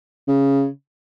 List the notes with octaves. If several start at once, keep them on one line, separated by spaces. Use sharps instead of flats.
C#3